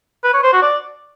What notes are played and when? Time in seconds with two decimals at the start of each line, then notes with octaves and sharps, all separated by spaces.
0.24 B4
0.34 C#5
0.43 C5
0.53 F#4
0.62 D5